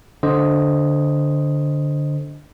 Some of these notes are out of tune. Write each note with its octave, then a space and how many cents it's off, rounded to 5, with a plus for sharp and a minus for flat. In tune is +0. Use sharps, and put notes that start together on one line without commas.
D3 +0 C5 +0 D#5 +0